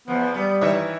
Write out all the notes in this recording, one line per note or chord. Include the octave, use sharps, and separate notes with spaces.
E2 F3 B3
G3 B3
D#3 E3 D#4 C#5 E5